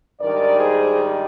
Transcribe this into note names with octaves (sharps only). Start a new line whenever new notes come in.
G#2 D#3 G3 D4 A#4 D5
G#4 C5